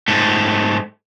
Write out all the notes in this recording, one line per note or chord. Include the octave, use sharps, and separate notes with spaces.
G#2 A3